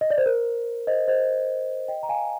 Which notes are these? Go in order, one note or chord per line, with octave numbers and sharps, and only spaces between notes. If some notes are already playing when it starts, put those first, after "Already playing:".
D#5
D5
C5
A#4
C5 D#5
C5 D#5
D#5 G5
A#5
F5 G#5